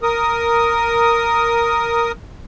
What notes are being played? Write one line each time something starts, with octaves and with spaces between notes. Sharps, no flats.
A#4 D#6